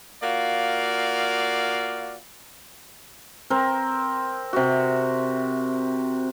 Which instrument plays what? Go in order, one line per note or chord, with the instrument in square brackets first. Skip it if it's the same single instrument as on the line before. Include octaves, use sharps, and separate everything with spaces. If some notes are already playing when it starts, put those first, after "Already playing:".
[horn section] A#3 F4 F#4 D5 F5
[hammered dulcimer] C4 A#4
C3 F#4